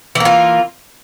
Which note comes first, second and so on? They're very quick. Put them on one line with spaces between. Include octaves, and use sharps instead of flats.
E3 A#3 F4